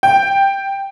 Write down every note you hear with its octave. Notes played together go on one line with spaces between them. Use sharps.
G5